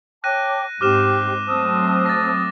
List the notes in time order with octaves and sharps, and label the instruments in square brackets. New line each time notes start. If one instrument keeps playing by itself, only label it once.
[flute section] C#5 A5 D6 [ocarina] G5 [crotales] F#6 A#6 D#7
[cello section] G#2 C4 [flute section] G4 [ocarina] C5 [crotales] D6 F6 E7
[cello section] F#3 A3 C4 [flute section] C5 A5 E6 [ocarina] D#6
[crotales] A6 A#6